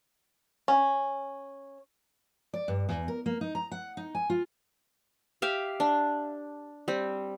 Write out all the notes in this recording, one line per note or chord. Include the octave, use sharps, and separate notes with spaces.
C#4
D5
G2
E2
A#4
A#3
D#4
A#5
F#5
D#4
G#5
F4
G4 E5 F5
D4
G3 C4